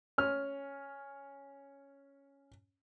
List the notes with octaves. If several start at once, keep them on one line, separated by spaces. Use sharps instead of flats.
C#4 F6